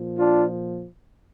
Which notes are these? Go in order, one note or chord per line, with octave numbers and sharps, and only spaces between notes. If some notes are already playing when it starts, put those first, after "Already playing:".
Already playing: A#2 F3
D4 F4